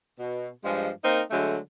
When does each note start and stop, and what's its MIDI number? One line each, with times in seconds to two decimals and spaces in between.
0.19 0.49 47
0.65 0.90 43
0.65 0.90 53
0.65 0.90 56
1.04 1.21 58
1.04 1.21 60
1.04 1.21 63
1.04 1.21 70
1.31 1.57 50
1.31 1.57 54
1.31 1.57 56
1.31 1.57 57